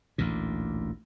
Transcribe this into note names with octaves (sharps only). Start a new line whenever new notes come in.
A1 D2 A#2